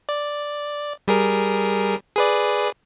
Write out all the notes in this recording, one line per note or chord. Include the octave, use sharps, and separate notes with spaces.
D5
G3 G#4 A#4
G#4 B4 D5